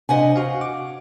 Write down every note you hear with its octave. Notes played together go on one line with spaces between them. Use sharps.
C3 D4 C5 D#5 F#5 G#5
F#4 F5
D6